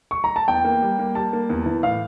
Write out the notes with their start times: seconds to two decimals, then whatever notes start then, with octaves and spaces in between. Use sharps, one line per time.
0.11 C#6
0.24 A#5
0.36 A5
0.48 E2 G5
0.64 A#3
0.82 G3
0.99 A#3
1.15 G3 A5
1.33 A#3
1.49 E2
1.66 E3
1.83 A2 F5